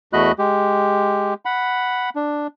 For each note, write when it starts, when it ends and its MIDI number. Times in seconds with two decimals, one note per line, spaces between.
0.13 0.32 40
0.13 0.32 57
0.13 0.32 66
0.13 0.32 75
0.13 0.32 83
0.13 0.32 90
0.39 1.34 56
0.39 1.34 67
1.45 2.10 78
1.45 2.10 83
2.16 2.47 62